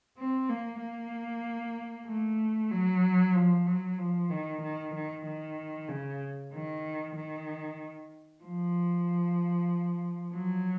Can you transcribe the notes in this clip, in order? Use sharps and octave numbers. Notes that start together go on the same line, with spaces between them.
C4
A#3
A#3
A3
F#3
F3
F#3
F3
D#3
D#3
D#3
D#3
C#3
D#3
D#3
F3
F#3